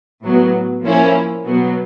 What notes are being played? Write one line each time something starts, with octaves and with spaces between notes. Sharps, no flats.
A2 F#3 B3
F3 A#3 C#4 E4
B2 F#3 B3